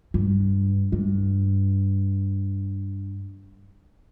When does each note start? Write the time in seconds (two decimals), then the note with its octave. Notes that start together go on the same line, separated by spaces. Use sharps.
0.14 G2
0.92 G2